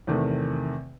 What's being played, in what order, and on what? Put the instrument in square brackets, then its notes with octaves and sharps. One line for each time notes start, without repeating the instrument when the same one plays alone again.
[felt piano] E2 C3 D#3 A3